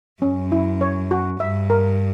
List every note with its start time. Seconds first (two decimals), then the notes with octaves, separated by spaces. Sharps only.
0.22 F#2 C#4
0.52 E4
0.81 C#5
1.11 F#4
1.40 G2 E5
1.70 A#4